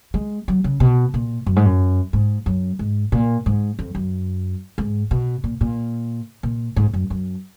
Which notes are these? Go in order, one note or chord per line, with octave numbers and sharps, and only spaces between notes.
G#3
F#3
C#3
B2
A#2
F#2
G#2
F#2
G#2
F#2
G#2
A#2
G#2
F2
F#2
G#2
B2
A#2
A#2
A#2
G#2
F#2
F#2